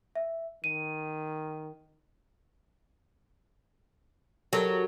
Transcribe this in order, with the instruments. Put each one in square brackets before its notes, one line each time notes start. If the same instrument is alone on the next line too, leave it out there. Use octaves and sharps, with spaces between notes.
[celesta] E5
[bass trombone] D#3 [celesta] D#7
[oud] F#3 [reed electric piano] G4 A4 A#4